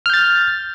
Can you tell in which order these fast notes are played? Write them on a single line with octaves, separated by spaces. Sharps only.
F6 G6 A6